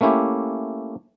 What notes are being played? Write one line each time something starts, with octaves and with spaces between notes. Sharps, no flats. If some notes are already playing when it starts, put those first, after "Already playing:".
A3 A#3 C#4 E4 G4